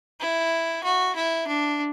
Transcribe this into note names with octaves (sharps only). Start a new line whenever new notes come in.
E4
F#4
E4
D4